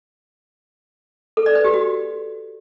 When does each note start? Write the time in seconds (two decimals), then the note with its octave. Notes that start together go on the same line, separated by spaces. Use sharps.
1.37 A4
1.46 D5
1.55 B4
1.64 G4
1.74 F#4